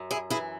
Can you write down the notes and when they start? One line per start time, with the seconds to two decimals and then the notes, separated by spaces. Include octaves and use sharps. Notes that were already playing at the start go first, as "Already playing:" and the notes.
Already playing: F#2
0.11 E4 G#4
0.30 E3 E4 G#4